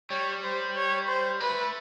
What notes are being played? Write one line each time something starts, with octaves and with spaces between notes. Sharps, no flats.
G3 C#5
C5
C#5
C5
A3 B4